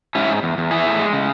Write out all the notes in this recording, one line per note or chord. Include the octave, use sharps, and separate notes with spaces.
G#2 C#4 E4
G#2
E2
E2
E3 E4 G#4
A2
G#3
C#3